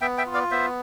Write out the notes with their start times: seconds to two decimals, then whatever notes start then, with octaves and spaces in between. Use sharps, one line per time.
0.01 B3 E5 G5
0.17 E5 G5
0.26 F4
0.34 D5 F5
0.51 B3 C5 E5